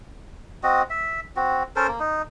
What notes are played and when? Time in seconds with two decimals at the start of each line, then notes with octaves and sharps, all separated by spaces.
0.63 C4 F#4 D#5
0.90 E5
1.36 C4 F#4
1.76 C#4 A4 A#4 C5
1.88 A#3
2.00 D#4